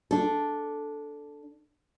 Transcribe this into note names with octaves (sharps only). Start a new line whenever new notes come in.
D4 A4